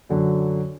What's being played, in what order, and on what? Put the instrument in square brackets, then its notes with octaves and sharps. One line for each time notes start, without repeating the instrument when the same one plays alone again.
[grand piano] F#2 D3 F#3